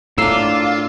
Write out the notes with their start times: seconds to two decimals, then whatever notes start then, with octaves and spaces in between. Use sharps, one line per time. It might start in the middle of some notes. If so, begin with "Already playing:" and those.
0.18 A2 A#3 D4 F4 E6 C7